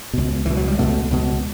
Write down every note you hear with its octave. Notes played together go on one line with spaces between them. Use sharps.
C#2 B2
C#2 B2 E3
F#3
G3
C#2 B2 A3
C#2 B2